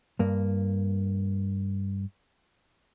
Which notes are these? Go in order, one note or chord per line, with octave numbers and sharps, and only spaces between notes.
G2 A#3